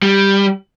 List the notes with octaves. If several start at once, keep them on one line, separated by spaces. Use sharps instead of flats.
G3